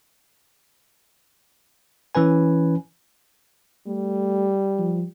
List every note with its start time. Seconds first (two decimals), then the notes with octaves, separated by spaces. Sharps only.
2.15 E3 C#4 B4 G#5
3.87 G3 A3
4.79 F3